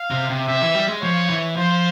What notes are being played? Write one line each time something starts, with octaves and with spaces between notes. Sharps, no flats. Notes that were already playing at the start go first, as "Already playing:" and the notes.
Already playing: F5
C3
C3
C3 E5
E3
G3
G#3
F3 C#5
E3
F3 C5